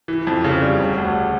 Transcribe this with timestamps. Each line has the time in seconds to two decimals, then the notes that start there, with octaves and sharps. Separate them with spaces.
0.08 E3
0.27 F2
0.44 C#3
0.62 G3
0.80 E1
0.98 D2